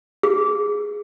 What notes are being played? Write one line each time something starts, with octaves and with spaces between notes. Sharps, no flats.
G#4